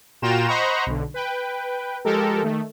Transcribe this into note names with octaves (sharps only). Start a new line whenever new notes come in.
A#2 F4 F#4 G5 A#5 E7
C5 D#5 F#5 A#5 B5 C#6
B1 D3
B4 G5
F3 G#3 G4 A4 A#4
D#3 A3